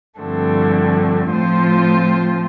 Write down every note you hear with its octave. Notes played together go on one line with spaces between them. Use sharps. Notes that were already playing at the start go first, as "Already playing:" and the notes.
G2 D3 F3 A3 C4
A2 F3 C4 F4 C5